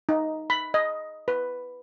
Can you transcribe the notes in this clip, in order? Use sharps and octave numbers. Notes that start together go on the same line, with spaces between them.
D#4
B5
D#5
B4